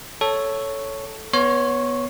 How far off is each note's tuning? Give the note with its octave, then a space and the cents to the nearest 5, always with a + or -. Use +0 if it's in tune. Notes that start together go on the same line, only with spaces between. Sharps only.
A4 +0 C#5 +0
B3 -10 C#5 +0 C6 +35